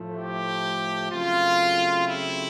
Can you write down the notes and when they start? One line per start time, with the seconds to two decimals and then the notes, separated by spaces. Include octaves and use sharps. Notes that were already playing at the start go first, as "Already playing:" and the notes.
Already playing: A2 F3 A3
0.18 G4
1.12 C#3 F#3 A3 C4 F4
2.05 E4